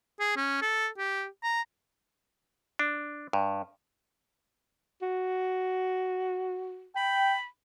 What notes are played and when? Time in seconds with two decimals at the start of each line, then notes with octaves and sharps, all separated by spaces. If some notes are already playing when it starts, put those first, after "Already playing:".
0.20 G#4
0.36 C#4
0.62 A4
0.98 G4
1.43 A#5
2.79 D4
3.33 G2
5.02 F#4
6.96 G5 B5